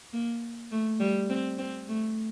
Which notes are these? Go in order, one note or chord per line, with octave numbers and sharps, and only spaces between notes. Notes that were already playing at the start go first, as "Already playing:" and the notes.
A#3
A3
G3
C4
C4
A3